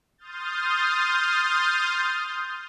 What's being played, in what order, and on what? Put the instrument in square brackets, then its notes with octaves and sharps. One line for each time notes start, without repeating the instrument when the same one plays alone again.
[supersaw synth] C6 D#6 F6 G6 A6